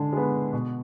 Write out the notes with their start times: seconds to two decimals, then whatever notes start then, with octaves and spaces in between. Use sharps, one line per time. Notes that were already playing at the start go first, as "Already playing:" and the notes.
Already playing: D3 G#3 A5
0.13 G#3 B3
0.53 B2